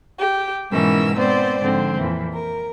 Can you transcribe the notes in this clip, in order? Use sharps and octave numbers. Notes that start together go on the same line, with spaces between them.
G4
G#2 B2 E3 C#4 A#4 E6
B3 C4 C5 D5
G#2 D3 F3 C4
F2 A#2 E3
A#4